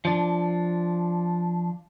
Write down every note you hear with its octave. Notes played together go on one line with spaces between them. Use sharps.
F3 D4